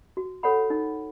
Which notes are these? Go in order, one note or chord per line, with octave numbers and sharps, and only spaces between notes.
F#4
A4 C#5 F#5 B5
D#4